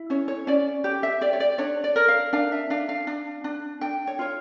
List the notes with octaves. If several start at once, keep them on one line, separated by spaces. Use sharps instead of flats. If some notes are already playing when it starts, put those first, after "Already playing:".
Already playing: E4
C#4 C#5
C#5
C#4 D5
G4
E5
G4 D5
C#5
D5
D4 C#5
D5
A#4
F5
D4 F5
E5
D4 F5
F5
D4
D4
D4 G5
C#5
F4 C#5